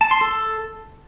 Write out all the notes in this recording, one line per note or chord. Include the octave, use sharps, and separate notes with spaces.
A5
C6
A4